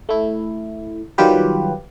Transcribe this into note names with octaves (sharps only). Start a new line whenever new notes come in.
A3 E4
D#3 F#3 G3 F4 G4 B4